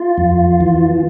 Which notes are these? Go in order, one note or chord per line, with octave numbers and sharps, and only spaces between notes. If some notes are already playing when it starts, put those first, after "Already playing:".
Already playing: F4
F2
E3